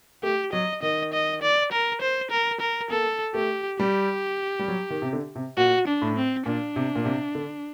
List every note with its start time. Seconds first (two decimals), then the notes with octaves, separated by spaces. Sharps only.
0.23 A3 G4
0.53 F#3 D#5
0.82 D#3 D#5
1.13 D#5
1.42 D5
1.72 A#4
2.01 C5
2.31 A#4
2.60 A#4
2.90 A#3 A4
3.34 A3 G4
3.80 G3 G4
4.59 G3
4.68 F#3
4.90 D#3
5.02 C3
5.13 D3
5.36 C3
5.57 A#2 F#4
5.87 D4
6.02 A2
6.16 C4
6.46 A#2 D4
6.76 C3
6.96 A#2
7.05 C3
7.35 D3